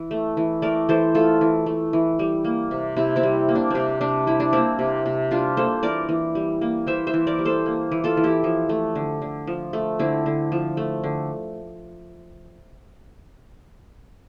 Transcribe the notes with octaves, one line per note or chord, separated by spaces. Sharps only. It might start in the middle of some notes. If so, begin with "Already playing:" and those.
Already playing: E3
A3
E3
A3 A#4 D5
E3 A4 C5
A3 F4 A4
E3
A3
E3
G3
A#3
C3
C3 C4 E4
C4 E4
G3
A#3
D4
C3 C4 D4
C3 D4
G3 E4
D4
A#3 C4 E4
C3
C3
G3 D4 F4
A#3 A4 C5
E3 A#4 D5
E3
G3
A#3
E3 C5 E5
C5 E5
E3
A#4 D5
G3
A4 C5
A#3
E3
F4 A4
E3
E4 G4
F3
A3
D3
D3
F3
A3
D3 C4 E4
D3
F3
A3
D3